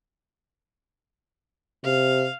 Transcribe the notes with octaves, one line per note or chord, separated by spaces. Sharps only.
C3 F5